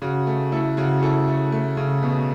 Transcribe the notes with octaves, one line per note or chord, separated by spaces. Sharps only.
C#3 F#4
A3
A3 E4 A4
C#3 F#4
C#3 E4 A4
A3
A3
C#3
B2